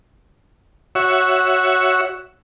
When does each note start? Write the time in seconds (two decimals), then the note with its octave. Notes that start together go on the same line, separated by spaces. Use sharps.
0.95 F#4 C#5 E5